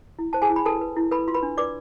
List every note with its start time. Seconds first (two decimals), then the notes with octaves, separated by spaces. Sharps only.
0.19 E4
0.33 C5 A5
0.42 G#4 G#5
0.50 E4
0.56 B5
0.65 A4 B4 A5
0.81 B4
0.97 E4
1.11 A4 B4 B5
1.28 F4 C6
1.34 B4 B5
1.43 D4
1.58 B4 D5 D6